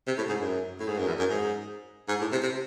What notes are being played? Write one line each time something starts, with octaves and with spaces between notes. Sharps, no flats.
C3
A2
G#2
F#2
A2
G#2
F#2
E2
F#2
G#2
G#2
A2
C3
C3